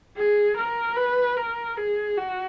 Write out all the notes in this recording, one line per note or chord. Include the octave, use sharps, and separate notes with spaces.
G#4
A#4
B4
A#4
G#4
F#4